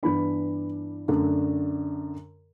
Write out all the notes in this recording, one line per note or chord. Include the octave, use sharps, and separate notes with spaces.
G2 E3 B3 D4 B5
F#2 D3 A3 D4